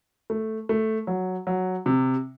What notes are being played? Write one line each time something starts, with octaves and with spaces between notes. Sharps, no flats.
A3
A3
F#3
F#3
C3